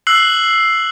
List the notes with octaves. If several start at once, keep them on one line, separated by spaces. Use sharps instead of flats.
E6 F#6 C7 F#7